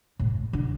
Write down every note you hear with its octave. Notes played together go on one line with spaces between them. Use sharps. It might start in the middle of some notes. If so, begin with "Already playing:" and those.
A2
D3